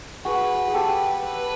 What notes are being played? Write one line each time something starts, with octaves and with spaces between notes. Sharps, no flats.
F#4 G#4 B4
G#4
G4 A4
B4